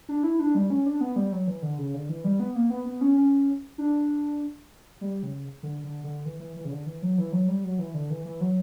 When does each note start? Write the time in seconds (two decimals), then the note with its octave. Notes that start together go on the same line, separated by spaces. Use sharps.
0.09 D4
0.23 E4
0.39 D4
0.55 G3
0.70 C#4
0.86 D4
1.01 B3
1.16 G3
1.32 F#3
1.47 E3
1.62 D3
1.78 C#3
1.94 D3
2.09 E3
2.24 G3
2.40 B3
2.56 A#3
2.70 B3
2.85 B3
3.01 C#4
3.17 C#4
3.78 D4
5.01 G3
5.23 C#3
5.63 D3
5.84 D3
6.04 D3
6.26 E3
6.40 E3
6.56 E3
6.65 C#3
6.71 D3
6.86 E3
7.02 F#3
7.18 E3
7.32 F#3
7.48 G3
7.64 F#3
7.79 E3
7.94 D3
8.10 E3
8.25 E3
8.41 F#3